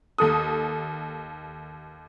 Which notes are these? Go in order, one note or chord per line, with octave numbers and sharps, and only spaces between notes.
D#2 A4 D#6